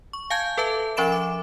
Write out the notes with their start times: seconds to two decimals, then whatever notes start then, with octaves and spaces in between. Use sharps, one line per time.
0.13 C#6
0.30 F5 G#5 A5 G6 G#6
0.58 A4 B4 E5 A5
0.97 F3 C#4 E5 B5 D7 E7
1.12 D6